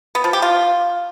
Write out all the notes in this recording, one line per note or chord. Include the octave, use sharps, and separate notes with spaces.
B3
F3
G4
F4